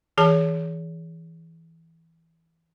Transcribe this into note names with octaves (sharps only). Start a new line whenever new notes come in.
E3 G#4 A5